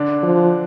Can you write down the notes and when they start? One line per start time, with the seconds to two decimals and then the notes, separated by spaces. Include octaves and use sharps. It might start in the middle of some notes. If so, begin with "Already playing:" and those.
Already playing: D3 D4
0.23 F3